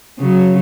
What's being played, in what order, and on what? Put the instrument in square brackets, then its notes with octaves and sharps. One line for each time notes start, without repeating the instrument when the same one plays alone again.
[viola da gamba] C#3 F#3